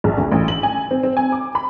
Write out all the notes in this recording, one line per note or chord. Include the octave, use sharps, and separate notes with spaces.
A#1
D2
A1
F#7
G#5
C4
C4
G#5
D6
B5